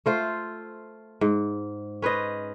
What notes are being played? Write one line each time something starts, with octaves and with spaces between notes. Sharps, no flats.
A3 F4 C5
G#2
C#4 B4 C5 D#5